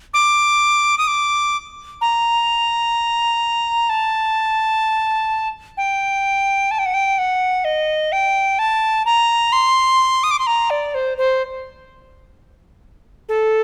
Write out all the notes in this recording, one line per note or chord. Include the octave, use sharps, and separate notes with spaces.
D6
D#6
D6
A#5
A5
G5
A5
G5
F#5
G5
F#5
D#5
G5
A5
A#5
C6
D#6
D6
C6
A#5
D5
C5
C5
A4